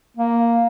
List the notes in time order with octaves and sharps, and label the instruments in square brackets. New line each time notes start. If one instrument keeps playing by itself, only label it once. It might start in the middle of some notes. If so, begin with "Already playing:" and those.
[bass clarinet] A#3